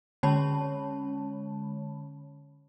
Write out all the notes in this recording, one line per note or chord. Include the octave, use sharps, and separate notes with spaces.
D3 G#3 C#4 C#5 A5 B5